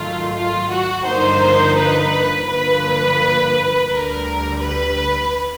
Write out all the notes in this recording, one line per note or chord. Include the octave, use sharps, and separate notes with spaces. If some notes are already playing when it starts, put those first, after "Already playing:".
Already playing: G#2 D#3 F#3 A3 F4
F4
F#4
G2 D3 F3 A#3 D#4 C5
B4
G2 D3 F3 A#3 B4
D2 D3 G3 A#4
B4